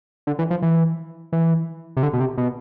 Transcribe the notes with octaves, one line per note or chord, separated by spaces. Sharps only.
D3
E3
F3
E3
E3
C3
D3
B2
C3
B2